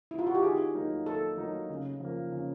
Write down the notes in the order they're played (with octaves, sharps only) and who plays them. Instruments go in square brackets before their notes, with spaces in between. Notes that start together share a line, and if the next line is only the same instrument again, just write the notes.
[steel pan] E4
F4
F#4
G4
[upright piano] D#3 [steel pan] G#4
[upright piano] F#3 A#3 D#4
[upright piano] D#3 [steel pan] A4
[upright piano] F#3 A#3 D#4
C#3
F3 A#3
C#3